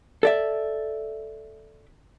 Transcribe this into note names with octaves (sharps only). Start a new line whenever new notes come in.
A4 D5 E5